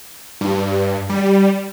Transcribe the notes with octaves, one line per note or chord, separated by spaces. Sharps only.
G2
G3